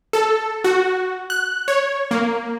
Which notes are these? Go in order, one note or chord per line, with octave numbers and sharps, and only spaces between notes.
A4
F#4
F#6
C#5
A#3